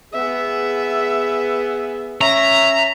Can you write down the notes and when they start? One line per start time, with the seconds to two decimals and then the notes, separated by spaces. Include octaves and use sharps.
0.13 B3 G#4 E5
2.21 C#4 C#5 E5 A#5